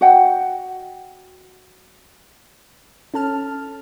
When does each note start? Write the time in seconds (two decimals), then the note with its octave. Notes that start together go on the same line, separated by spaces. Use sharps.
0.01 F#4 D#5 F#5 G5
3.14 C#4 A4 A5 F6